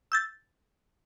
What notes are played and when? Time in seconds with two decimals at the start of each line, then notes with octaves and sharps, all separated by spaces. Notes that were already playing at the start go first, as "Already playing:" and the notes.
0.12 E6 G6 A6